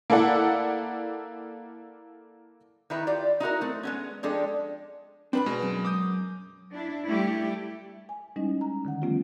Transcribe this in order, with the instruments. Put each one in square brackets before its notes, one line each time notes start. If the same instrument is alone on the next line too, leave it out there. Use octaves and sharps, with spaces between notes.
[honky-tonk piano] A#3 E4 A4 D5 F#5
[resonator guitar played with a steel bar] D#3 D#4 E4 B4
F4 G4 D5
D#4 E4 F#4 A#4
A3 C4
G#3 B3 C#4
F3 G#3 D4 G4 A4
[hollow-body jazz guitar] C4 B4 B5 [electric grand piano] D4
[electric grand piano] B2 G#3
[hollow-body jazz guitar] F#2
[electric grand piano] D6 D#6 G6
[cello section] D4 E4
G3 A3 E4 G4
[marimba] G#5
G3 G#3 C#4 D#4 E4 D#5
A#5
D3 D#3 F#5
F3 G3 A3 B3 C#4 F4